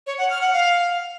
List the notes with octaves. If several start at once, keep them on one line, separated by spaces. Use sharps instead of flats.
C#5
F#5
F6
F#5
F5